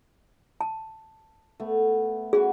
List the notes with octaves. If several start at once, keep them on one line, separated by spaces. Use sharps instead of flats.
A5
A3 B3
C#4 F#4 G#4 B4